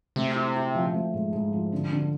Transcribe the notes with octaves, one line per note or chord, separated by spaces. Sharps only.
C3 A3
E4
E4
F3
A3
G#2
G#2
F3
D3
D3